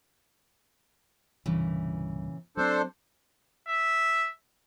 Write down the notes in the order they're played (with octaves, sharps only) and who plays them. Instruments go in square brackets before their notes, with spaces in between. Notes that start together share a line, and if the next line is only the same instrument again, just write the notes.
[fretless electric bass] C2 G2 [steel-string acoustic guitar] A#2 C#3 E3
[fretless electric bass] F#3 C4 [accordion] D4 A4 C5
[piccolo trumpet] E5